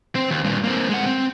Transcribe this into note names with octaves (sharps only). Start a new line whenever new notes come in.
C4 C5
D#2
G2 A#2
A#3 C4
G#3 F#5
C4